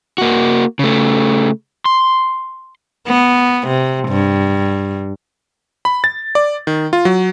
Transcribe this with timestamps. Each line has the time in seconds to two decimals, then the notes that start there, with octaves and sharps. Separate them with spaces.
0.18 A#3 F#4
0.79 C#3 A3
1.85 C6
3.07 B3
3.67 C3
4.09 G2
5.85 B5
6.04 A6
6.35 D5
6.67 D#3
6.93 F4
7.05 F#3